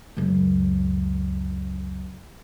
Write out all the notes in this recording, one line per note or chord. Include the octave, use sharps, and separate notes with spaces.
C#2 F#2